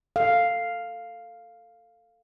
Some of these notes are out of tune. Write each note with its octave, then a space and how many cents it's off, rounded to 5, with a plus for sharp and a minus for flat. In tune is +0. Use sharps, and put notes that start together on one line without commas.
A4 +20 F5 +0